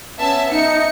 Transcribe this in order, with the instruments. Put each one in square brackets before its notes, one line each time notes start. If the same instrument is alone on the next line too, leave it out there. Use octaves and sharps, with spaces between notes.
[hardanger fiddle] B3 C#4 [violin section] E5 A5
[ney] D#4 [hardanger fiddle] E5 [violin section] C#7